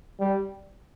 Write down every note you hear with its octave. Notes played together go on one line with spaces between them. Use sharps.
G3